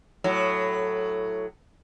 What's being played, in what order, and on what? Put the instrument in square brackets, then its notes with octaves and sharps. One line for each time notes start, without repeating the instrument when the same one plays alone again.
[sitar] A2 F#3